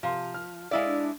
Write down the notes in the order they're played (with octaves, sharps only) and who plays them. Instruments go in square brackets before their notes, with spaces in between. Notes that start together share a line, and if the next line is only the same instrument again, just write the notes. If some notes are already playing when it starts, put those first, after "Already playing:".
[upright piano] C3 F5 C6 [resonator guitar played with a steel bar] F3
[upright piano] F6
[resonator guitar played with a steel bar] G#3 E4 D5 [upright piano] E5 F5
[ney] D4